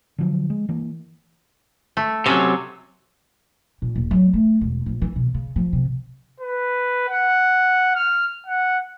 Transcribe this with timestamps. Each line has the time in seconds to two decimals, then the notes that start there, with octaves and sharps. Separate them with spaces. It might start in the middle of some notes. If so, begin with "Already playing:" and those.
0.18 D3 F3 F#3
0.50 G#3
0.69 E3 A#3
1.97 A3
2.26 C3 F#3 C#4 A4
3.82 A#2
3.96 D#1
4.11 F#3
4.33 A3
4.61 E1
4.86 A#1
5.02 E3
5.16 B2
5.34 C#3
5.56 F3
5.73 C3
6.40 B4
7.08 F#5
7.95 F6
8.47 F#5